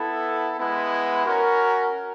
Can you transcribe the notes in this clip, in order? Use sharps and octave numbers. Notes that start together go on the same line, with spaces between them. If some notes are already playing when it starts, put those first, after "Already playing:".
Already playing: B3 E4 A4
G#3 B3 E4
C#4 F#4 A#4